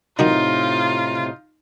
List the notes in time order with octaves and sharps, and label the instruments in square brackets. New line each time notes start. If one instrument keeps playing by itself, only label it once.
[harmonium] A2 C3 [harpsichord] D#3 F#3 D4 [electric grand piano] D#4 [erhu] F4